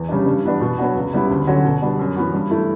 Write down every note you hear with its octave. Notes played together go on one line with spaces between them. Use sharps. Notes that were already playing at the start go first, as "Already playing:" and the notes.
Already playing: E2
C#3 G3 D4
G2
E3 B3 D4
B2
F#3 B3 D4 F#4
C#2
C#3 G3 B3 E4
D2
D3 F#3 C#4 F#4
B2
G3 B3 D4 F#4
F#2
E3 B3 F#4
G2
E3 A3 E4